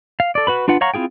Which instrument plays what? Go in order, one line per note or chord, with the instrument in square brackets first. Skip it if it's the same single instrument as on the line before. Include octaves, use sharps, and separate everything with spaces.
[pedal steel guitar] F5
A4 D5
F#4 B4 B5
D4 F4 B4 F#5
C#5 F5 F#5 A#5 C#6
C4 E4 F4 G#4 G5